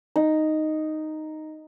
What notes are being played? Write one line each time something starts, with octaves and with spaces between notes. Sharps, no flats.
D#4